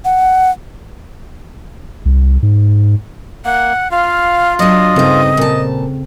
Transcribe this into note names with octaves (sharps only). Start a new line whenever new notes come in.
F#5
C2
G#2
A#3 F#5
F4 F5
F#3 D4 D#5
G2 C#3 C4 D#4 A4
A#2 A5